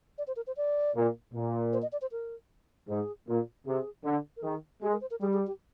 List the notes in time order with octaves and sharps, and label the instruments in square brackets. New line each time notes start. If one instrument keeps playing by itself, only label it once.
[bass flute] D5
C5
A#4
C5
D5
[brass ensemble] A#2
A#2
[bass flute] C5
D#5
D5
C5
A#4
[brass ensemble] G#2 [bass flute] G#4
[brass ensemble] A#2
[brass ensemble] C3 [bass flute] G#4
[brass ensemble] D3
[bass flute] A#4
[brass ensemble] D#3 [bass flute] G#4
[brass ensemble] G#3 [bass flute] G4
[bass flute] A#4
C5
A#4
[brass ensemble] G3 [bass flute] G#4
[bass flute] G#4
G4